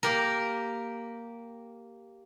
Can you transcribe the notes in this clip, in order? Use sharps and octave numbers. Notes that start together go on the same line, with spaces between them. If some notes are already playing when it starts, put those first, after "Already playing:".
A#3 G4 A#4